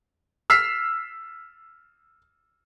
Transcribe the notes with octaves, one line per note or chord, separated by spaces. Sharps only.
E6 F6 B6 C7